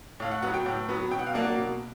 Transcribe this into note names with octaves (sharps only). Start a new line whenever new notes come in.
A2 F5
F#5
F#3 B3 F#5
G5
A2
F#3 B3
B2 G5
F#5
F5
F#3 A#3 D4 F#5
B2